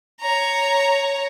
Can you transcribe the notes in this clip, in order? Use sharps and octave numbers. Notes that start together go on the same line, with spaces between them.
C#5 A#5